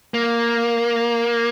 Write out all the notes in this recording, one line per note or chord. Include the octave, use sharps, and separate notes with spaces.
A#3